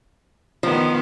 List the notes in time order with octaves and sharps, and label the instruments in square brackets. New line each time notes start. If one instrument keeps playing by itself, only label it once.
[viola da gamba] D#3 B3 [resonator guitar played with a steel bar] F3